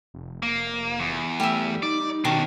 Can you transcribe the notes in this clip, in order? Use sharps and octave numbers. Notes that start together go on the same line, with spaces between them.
F1
A#3
E2
G3 A3 E5
D#4 D5
B2 D#3 C#4 D4